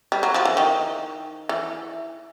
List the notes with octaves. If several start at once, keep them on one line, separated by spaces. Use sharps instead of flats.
G3
F#3
F3
E3
D#3
E3